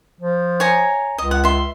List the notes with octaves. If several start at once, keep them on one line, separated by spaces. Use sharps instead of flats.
F3
C#5 G#5 A#5
C#2 D#5
F#5
E5 C6